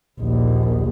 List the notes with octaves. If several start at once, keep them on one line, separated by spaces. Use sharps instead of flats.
A#1 D#2